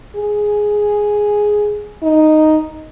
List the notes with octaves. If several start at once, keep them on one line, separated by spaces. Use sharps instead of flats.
G#4
D#4